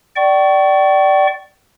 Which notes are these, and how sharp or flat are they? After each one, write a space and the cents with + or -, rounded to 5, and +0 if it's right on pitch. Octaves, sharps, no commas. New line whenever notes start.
D5 +0 G5 -40 C#6 +0